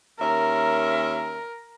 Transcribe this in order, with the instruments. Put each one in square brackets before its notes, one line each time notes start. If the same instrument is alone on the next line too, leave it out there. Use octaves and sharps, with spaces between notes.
[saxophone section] D#2 C#4 E5 [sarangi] A#4